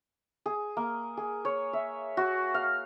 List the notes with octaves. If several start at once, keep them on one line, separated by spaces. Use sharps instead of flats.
G#4
A#3
G#4
C#5
E5
F#4
F5